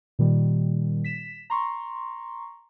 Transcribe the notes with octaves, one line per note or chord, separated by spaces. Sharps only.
A#2 D#3 G3
B6 E7
A#5 C6 C#6